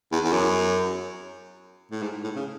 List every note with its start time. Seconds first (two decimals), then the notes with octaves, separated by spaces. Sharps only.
0.12 E2
0.24 E2
0.32 F#2
1.91 A2
2.02 G#2
2.23 A2
2.36 C#3